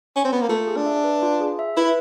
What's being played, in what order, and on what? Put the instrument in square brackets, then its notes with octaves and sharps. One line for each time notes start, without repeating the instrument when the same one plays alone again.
[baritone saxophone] C#4
C4
B3
A#3
[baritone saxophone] A3 [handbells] F4
[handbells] G#4
[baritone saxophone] D4
[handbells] E5
B4
F4
G#4
E5
[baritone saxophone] E4 [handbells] B4